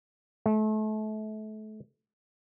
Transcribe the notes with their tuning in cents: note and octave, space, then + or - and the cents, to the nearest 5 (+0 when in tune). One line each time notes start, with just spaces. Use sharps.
A3 -30